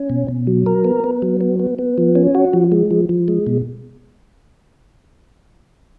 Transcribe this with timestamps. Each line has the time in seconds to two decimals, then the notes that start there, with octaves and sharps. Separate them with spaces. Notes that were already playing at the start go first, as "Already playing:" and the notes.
Already playing: C#4
0.10 B2
0.28 B2
0.47 F#3
0.66 A#4
0.84 B3
1.04 B3
1.22 F#3
1.41 B3
1.59 B3
1.79 B3
1.98 F3
2.15 C#4
2.35 F#4
2.53 F3
2.72 G#3
2.91 F3
3.09 F3
3.28 G#3
3.47 B2